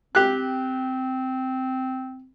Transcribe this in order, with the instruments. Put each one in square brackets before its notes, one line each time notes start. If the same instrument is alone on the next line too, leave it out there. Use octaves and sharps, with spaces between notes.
[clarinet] C4 [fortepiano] G4 F#6